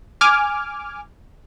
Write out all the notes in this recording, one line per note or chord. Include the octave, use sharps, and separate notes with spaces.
G#5 D6 F6